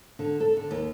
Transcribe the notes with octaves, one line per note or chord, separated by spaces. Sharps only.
D3
A4
D3
D#2